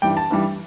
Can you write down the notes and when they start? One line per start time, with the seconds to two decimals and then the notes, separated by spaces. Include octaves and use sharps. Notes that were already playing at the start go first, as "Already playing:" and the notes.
0.02 G2 E3 G3 G5
0.17 A5
0.31 G2 E3 G3